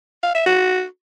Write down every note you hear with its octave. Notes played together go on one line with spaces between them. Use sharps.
F5
E5
F#4